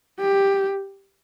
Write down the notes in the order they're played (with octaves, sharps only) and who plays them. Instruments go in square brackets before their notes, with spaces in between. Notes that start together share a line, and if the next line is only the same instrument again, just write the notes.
[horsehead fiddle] G4